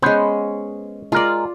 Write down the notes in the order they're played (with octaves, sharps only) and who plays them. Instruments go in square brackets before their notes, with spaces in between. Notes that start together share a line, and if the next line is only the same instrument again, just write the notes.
[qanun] G#3 C#4 [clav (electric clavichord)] B3 B4 C5
[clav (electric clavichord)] G#3 A#4 [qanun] F4 D5